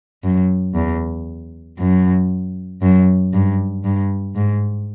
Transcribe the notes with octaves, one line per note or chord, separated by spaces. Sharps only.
F#2
E2
F#2
F#2
G2
G2
G#2